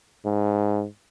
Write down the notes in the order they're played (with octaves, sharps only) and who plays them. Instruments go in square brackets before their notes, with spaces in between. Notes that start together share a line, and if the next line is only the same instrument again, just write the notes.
[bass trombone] G#2